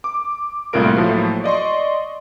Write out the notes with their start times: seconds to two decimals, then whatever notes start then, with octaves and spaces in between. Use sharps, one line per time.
0.04 D6
0.73 C2 A2 A#3 F4 A#4 D7
0.96 A2 F3 F#3 A3 A#3
1.44 D5 D#5 C6 C#6